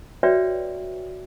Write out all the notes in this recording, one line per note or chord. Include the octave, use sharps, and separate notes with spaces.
F#4 B4 C#5 D5 E5 G5